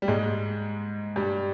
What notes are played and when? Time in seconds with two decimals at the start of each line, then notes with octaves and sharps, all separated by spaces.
0.02 G3
0.08 G#2 G#3
1.16 G2 G3